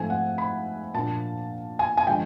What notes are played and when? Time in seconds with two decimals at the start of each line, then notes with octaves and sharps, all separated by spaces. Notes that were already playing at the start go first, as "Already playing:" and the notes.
Already playing: G#2 F3 A3 C4 G#5
0.10 F#5
0.38 B5
0.94 A#2 F3 A#3 D4 A5
1.79 G#5
1.97 G#5
2.07 D3 F3 G#3 G5